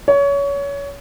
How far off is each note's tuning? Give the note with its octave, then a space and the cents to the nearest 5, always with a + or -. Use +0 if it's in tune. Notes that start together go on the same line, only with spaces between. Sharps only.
C#5 +25